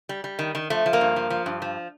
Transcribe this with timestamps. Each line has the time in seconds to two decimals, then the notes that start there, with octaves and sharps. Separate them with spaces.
0.09 G3
0.24 G3
0.39 D#3
0.55 D#3
0.70 F3 A3
0.86 F3
0.93 A#3
1.01 G2
1.16 F3
1.30 F3
1.46 G2
1.62 F3